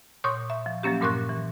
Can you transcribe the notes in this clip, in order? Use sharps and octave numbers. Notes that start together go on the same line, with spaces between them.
A#2 C#5 C6 C#6 D#6 G6
E5
F3
F3 F#3 A#3 C#4 G4
G2 A#2 A#4 C6 C#6 F#6
E3